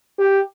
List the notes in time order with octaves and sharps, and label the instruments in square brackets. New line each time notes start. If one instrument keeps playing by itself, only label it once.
[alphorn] G4